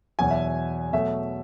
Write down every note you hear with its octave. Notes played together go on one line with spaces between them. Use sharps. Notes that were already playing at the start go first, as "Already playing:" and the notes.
E2 B2 F#3 G#5
E5
B2 F#3 A3 E5